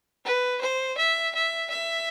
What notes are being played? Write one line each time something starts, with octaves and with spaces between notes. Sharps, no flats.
B4
C5
E5
E5
E5